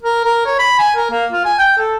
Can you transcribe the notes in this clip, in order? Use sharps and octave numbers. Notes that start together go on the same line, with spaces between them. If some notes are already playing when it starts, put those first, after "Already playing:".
A#4
A#4
C#5
B5
G#5
A#4
A#3
F4
G#5
G5
A4